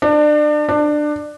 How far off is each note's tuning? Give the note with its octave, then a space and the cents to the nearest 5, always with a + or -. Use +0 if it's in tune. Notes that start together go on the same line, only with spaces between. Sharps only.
D4 +30
D4 +20